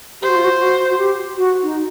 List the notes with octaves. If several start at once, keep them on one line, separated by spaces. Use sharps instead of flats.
G4 C5
F#4
F4
F#4
F#4
F#4
G4
F#4
D#4